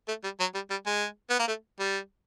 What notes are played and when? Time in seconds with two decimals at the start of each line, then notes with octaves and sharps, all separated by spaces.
0.08 A3
0.24 G3
0.40 F#3
0.55 G3
0.70 G3
0.86 G#3
1.30 B3
1.40 A#3
1.48 A3
1.79 G3